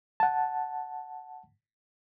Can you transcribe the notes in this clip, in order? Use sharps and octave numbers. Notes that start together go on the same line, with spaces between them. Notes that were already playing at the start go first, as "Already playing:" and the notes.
F#5 A5